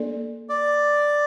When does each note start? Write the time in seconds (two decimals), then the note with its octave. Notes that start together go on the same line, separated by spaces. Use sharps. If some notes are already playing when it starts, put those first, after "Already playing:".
Already playing: A#3 D4 A4 D5
0.49 D5